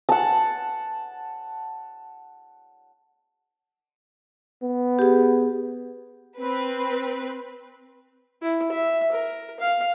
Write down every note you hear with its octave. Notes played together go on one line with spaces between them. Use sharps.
F#5 A5
B3
G4 G#4
C4 B4
E4
E5
A#4
F5